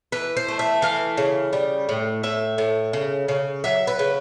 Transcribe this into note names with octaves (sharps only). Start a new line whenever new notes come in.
E3 B4
C5
A3
E5
E3 F5
C#3
G3
A2
A2 E5
A2
C#3
C#3
F#3 E5
B4
C#3